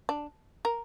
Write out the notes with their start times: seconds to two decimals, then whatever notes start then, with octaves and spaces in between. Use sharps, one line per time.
0.09 D4
0.65 A#4